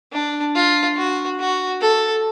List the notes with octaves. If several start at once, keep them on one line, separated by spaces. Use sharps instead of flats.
D4
F4
F#4
F#4
A4